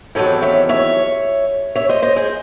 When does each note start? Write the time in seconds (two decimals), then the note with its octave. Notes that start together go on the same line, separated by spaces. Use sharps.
0.15 E2 C3 D#3 F#3 A4 C#5
0.42 C#5 E5
0.69 C#5 E5
1.76 C#5 E5
1.89 C5 D#5
2.02 C5 D#5
2.16 G#4 C5